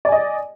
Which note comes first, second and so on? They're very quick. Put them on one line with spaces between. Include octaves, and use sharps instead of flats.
D5 G#5 D#5